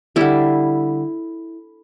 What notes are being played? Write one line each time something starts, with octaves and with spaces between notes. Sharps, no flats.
D3 G3 E4